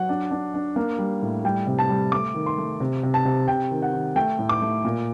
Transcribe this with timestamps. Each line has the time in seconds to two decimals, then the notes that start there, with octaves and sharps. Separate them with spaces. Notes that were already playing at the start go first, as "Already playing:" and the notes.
Already playing: F#3 F#5
0.09 D4
0.31 D4
0.54 D4
0.76 A#3
0.98 G3
1.22 A2
1.44 G3 G5
1.67 C3
1.79 A5
1.89 G3
2.12 A3 D6
2.34 D#3
2.46 C6
2.58 A3
2.80 C3
3.03 C3
3.14 A5
3.25 C3
3.48 C3 G5
3.71 D#3
3.82 F#5
3.93 D#3
4.16 A3 G5
4.39 A2
4.49 D6
4.62 A3
4.85 A#2